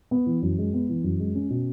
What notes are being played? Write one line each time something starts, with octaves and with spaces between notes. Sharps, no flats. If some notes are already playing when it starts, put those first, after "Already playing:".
B3
E3
F#2
G#3
B3
E3
F#2
G#3
C#4
B2